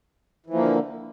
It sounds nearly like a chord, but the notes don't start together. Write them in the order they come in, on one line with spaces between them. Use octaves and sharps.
E3 F3 A#3 D3